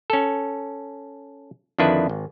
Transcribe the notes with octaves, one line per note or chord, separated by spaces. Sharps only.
C#4 A4
F2 D3 D#3 D4 E4 B4
G#1